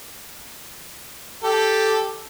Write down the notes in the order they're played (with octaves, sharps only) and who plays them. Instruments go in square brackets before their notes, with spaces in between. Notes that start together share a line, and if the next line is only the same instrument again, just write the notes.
[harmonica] G4 A4